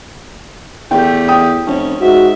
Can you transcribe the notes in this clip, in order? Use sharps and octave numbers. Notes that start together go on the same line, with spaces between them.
E2 A3 G4 G5
G5 D#6
F1 C#4
G#2 F#4 E5